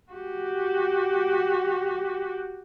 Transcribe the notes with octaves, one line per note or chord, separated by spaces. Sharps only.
F#4 G4